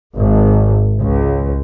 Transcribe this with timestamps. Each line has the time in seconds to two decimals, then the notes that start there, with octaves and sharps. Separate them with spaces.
0.16 G#1
1.00 C#2